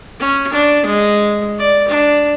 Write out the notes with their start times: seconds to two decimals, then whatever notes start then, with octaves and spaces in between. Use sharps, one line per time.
0.20 C#4
0.52 D4
0.85 G#3
1.59 D5
1.88 D4